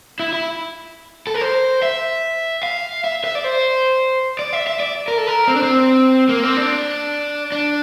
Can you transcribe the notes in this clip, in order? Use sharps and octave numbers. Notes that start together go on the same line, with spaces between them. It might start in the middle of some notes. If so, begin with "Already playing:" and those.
E4
E4
A4
A#4
C5
E5
F5
E5
E5
D5
C5
D5
E5
E5
D5
A#4
A4
A#4
C4
D4
C4
A#3
C4
D4
D4